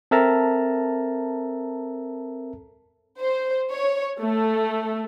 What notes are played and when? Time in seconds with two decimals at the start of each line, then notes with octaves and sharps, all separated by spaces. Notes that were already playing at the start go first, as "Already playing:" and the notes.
0.11 C4 A4 A#4 E5 A5 A#5
3.19 C5
3.72 C#5
4.20 A3